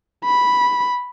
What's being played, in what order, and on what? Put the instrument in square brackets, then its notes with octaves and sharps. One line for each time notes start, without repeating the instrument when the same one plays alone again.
[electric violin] B5